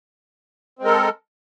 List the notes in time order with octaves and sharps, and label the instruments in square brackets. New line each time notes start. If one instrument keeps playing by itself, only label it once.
[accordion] C4
G#3
A#4
A4